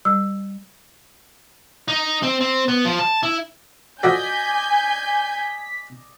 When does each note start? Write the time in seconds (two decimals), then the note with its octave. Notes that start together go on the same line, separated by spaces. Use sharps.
0.05 G3
1.88 D#4
2.23 C4
2.41 C4
2.68 B3
2.85 F3
2.99 A5
3.23 E4
4.03 F3 F#4 A4 D5 D#5 G#5 G6 B6